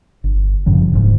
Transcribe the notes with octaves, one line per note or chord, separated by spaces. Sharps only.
G1
F#2 A2 C#3 F3
D#1 A1 D2 G#2